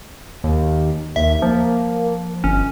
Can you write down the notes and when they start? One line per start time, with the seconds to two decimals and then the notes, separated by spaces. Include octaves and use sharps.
0.44 D#2
1.16 D#2 E5
1.42 F3 A#3
2.44 G1 C#4